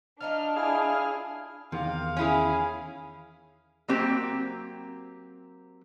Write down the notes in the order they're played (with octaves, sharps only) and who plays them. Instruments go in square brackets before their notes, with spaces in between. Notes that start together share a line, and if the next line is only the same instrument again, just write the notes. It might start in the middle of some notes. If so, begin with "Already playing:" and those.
[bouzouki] F3 D#4 F4 [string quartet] D4 [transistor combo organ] F6
[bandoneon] E4 F6 [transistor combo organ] G#4 F5
[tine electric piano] E2 D#3 [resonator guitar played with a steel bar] C3 [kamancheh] F5
[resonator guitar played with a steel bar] C#4 E4 G#4
F#3 A#3 C4 G4